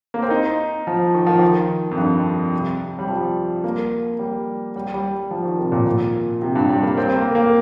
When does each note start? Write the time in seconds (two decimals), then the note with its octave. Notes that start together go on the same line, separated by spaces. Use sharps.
0.14 A#3
0.22 C4
0.30 D#4
0.87 F3
1.14 D#3
1.27 F3
1.39 D#3
1.91 F2
1.98 G2
2.53 C3
2.99 G3
3.09 F3
3.64 A#3
4.19 G3
4.76 G3
4.94 G3
5.31 F3
5.45 D#3
5.59 C3
5.72 A#2
5.87 A#2
6.42 C3
6.55 G2
6.69 G3
6.83 A#3
6.97 C4
7.17 A#3
7.35 A#3